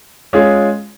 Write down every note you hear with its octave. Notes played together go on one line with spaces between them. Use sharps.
G#3 C#4 F4 G#4